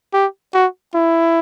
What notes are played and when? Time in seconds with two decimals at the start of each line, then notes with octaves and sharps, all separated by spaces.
0.13 G4
0.54 F#4
0.95 E4